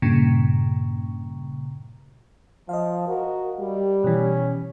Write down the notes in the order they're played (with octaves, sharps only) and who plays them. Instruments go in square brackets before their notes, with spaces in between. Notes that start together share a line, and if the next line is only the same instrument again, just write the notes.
[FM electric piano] G2 A#2 C#3
[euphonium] F3 [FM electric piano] D#5 F5
[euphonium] F#4 [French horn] A#4
[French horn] G3 [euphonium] G4
[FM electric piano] B2 E3 [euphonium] C#4